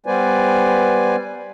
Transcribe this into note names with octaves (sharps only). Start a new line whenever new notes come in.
G3 B3 B4 C5 D5 G#5